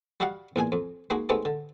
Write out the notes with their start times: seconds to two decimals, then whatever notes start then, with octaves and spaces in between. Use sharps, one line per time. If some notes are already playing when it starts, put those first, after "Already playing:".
0.20 G3 F#4 G4 D#5 F5 F#5
0.56 E2 A#2 G#4 G#5
0.72 F2
1.10 G#3 A#3 D#4 F#4 G#4
1.29 G#3 A3 B3 C4 D#4 G4
1.45 D3